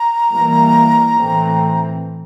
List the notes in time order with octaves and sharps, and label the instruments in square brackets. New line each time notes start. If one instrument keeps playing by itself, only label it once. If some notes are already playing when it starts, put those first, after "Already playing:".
Already playing: [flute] A#5
[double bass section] E3 G3 A#3
A2 E3 A3 C4